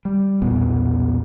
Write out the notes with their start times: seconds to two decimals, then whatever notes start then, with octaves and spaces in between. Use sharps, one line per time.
0.05 G3
0.42 B1 E2 A#2 B3